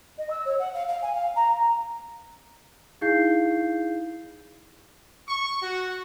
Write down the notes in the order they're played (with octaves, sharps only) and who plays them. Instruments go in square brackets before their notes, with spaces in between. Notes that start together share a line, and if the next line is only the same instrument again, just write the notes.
[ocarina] D#5
E6
C#5
F#5
F5
F5
G#5
F5
A#5
[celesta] D#4 E4 G#4 F5 G6 C7
[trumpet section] C#6
F#4